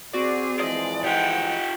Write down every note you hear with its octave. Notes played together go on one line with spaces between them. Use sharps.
C4 F#4 G#4 D5
E3 F3 G#3 D5 D#5
F4 G4 F#5 G5